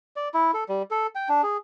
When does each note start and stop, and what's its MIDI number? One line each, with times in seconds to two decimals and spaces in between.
0.16 0.29 74
0.34 0.51 64
0.54 0.64 69
0.69 0.82 55
0.91 1.07 69
1.15 1.29 79
1.29 1.42 62
1.43 1.57 68